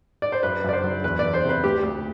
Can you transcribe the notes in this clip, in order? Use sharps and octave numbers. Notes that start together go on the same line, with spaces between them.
D5
C5
F#2 B4
F#2 D5
C5
F#3
E2 B4
E2 D5
C5
C3 B4
D2 G4
D2